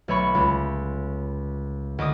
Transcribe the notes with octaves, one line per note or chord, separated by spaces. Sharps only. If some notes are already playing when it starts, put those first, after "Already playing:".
B1 A3 C#5 B5 C#6
C#2
D2 D#5 D6 D#6